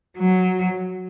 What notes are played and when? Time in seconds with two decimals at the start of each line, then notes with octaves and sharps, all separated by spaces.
0.18 F#3